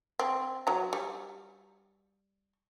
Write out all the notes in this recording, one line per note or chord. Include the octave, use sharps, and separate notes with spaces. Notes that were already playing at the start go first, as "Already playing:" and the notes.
C4
F#3 A#5
G3